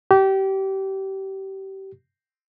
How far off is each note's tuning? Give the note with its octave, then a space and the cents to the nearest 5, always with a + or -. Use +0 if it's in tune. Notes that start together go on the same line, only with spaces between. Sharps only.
G4 -25